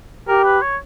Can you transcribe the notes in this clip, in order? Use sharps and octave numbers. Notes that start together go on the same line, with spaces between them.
G4 A#4
B4
C#5